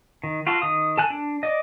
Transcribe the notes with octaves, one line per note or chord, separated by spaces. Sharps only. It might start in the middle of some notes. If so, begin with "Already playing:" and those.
D#3
F4 F#4 A4
D#3 D#6
A4 G#5 F#6
D4
D5 D#5